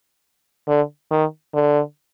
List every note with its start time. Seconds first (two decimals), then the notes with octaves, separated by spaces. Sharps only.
0.68 D3
1.11 D#3
1.54 D3